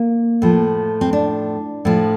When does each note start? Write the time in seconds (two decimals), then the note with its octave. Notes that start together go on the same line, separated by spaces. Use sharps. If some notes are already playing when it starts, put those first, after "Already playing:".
Already playing: A#3
0.42 A2 F3
1.01 C4
1.13 D4
1.85 A2 F3